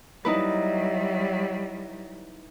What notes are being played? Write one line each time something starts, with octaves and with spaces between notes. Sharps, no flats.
F#3 G3 D#4 E4 B4